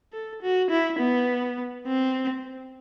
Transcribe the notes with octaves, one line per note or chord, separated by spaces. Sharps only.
A4
F#4
E4
B3
C4